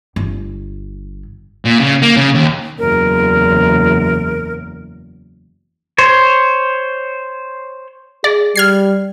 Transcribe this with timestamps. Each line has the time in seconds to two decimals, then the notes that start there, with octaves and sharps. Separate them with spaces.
0.16 G1
1.65 A#2
1.80 C#3
2.02 A#3
2.17 C#3
2.35 D#2
2.79 F#1 E2 A#4
5.98 C5 C#5
8.24 G#4 D5
8.56 G3 F6 G#6 C7